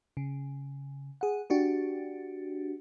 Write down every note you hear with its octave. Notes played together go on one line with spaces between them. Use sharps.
C#3
G#4 F#5
D4 F#4 G4